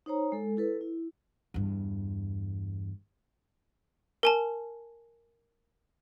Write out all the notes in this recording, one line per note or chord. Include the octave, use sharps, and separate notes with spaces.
D#4 C5 C#5 A#5
G#3 A4
E4 A4 B4
E4
E2 G2
A#4 G#5 A5